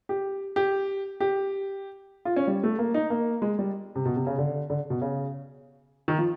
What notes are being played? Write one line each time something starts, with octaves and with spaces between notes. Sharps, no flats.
G4
G4
G4
F4
C#4
G3
A3
A#3
D#4
A#3
G#3
G3
C3
B2
C3
C#3
D3
D3
B2
C#3
D#3
F3